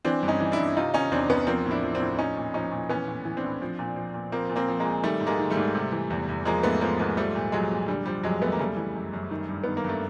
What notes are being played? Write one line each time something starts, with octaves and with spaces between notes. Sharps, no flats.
E3 C4 D4
G2
C#4 D#4
E3
D4 E4
G2
C3 D#4 F4
D#3 C#4 D#4
E2 C4 D4
E2 B3 C#4
F3 A#3 C4
A2
D4 E4
F3
C4 D4
A2
F3 C#4 D#4
A#2
F3 C#4 D#4
A#2
E3 B3 C#4
A2
E3
C4 D4
A2
F3
A#2
F3
A#2
F3 A#3 C4
A#2
A#3 C4
F3
G#3 A#3
A#2
D#3 G3 A3
G#2
G#3 A#3
D#3
G3 A3
G#2
C3
E3
E2
E2
F3 G#3 A#3
G#2 A3 B3
F3 G#3 A#3
G#2 G#3 A#3
F3 G3 A3
A#2
F3 F#3 G#3
A#2
D3 G3
F3 G3
F2 F#3 G#3
F2 A3 B3
A#3
C#3 G3 A3
E3
F#2
F#2
D#3
G2
D#3 B3
A#3
G2 A3